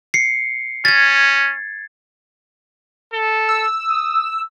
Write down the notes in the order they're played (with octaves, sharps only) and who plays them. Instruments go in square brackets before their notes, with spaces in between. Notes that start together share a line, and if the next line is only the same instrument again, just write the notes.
[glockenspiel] C7 C#7
[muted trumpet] C#4 [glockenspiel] G#6 A6
[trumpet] A4
[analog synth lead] E6
[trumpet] D#6